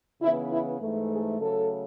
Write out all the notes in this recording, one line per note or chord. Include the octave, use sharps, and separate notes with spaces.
C#3 E3 B3 E4
E4
G#2 E3 A3
G#4
C#3 F#3 A3 A4